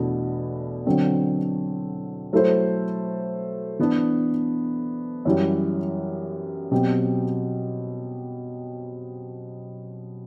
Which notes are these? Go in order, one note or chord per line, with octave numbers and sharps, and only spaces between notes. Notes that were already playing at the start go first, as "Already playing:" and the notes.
Already playing: E2 B2 A3 D4
D3 F#3 C4
F#3 A3 E4 A4 C5
E3 B3 D4
F#2 E3 G3
B2 F#3 C4 G4